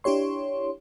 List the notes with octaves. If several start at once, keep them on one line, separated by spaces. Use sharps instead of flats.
D4 E4 G4 C#5 C6